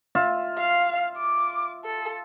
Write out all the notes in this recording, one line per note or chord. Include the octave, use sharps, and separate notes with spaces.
F4 E5
F5
D6
A4